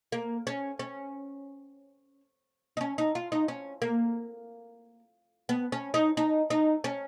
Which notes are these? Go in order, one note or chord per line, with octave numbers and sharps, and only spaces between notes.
A#3
C#4
C#4
D#4
C#4
D#4
F4
D#4
C#4
A#3
B3
C#4
D#4
D#4
D#4
C#4